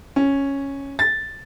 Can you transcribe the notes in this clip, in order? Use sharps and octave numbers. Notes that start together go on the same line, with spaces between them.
C#4
A6